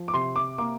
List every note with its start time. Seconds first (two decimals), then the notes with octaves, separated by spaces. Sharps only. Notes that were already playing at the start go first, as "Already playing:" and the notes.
Already playing: F3
0.08 D6
0.14 C3 C6
0.36 D6
0.58 A#3 D6